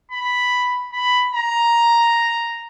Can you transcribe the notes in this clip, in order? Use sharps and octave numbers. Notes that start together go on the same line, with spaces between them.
B5
B5
A#5